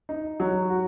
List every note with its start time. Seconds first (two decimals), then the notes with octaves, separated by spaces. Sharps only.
0.09 D#4
0.40 F#3
0.70 F#4